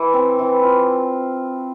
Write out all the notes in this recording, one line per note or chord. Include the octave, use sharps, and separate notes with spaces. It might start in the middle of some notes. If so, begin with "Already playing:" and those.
Already playing: E3
C4
E3
F4